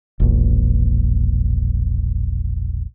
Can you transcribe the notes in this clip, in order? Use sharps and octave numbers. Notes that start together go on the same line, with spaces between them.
E1 A#1